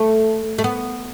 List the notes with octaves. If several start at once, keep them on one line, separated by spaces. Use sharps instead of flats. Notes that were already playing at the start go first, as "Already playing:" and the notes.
Already playing: A3
A3
B3